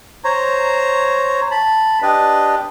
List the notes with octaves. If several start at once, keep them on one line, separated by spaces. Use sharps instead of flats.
C5 C#5 A#5
A5 B5
D4 G4 B4 D5 D#5